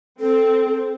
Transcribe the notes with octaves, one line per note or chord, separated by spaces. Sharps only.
C4 A4